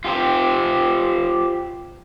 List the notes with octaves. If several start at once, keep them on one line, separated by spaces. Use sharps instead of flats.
F4 G4 C5